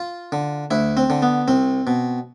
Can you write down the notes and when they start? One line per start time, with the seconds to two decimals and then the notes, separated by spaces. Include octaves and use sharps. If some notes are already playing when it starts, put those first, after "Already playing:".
Already playing: F4
0.32 D3
0.71 D2 E4
0.97 C4
1.10 D3
1.22 B3
1.48 C2 C4
1.87 B2